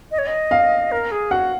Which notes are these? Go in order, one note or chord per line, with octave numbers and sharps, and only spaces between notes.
D#5
C#5
D#5
F5
A#4
G#4
F#4 F#5